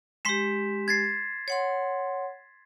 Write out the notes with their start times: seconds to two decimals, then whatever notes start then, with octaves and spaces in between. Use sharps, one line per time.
0.25 G#3 G4 C6 B6 E7
0.88 G#6 A6 C7
1.48 C#5 F#5 C6